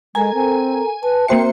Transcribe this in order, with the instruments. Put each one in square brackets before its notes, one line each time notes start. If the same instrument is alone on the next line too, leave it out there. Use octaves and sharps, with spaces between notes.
[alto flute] G#3 [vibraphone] A4 A#4 A#5 [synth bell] G#5
[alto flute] C4
[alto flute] B4 [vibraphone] A5
[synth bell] A#3 C5 C#7 [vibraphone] C4 F#4 E5 [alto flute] G5